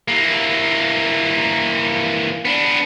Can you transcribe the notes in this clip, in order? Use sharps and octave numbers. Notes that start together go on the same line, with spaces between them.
E3 A#3
B3 D4